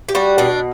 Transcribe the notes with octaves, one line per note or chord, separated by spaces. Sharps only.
G4
G3 F#4
B2 D4